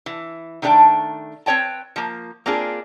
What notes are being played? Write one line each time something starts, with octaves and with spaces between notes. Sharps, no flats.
E3
D#3 A3 D4 A#4 G5 A5
C4 B4 C#5 G5 A5
F3 A#3
A#3 C4 D4 F4 G#4